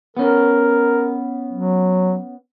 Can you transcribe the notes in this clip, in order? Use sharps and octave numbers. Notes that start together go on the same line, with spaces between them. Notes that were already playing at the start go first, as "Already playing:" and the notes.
B3 C#4 A#4
F#3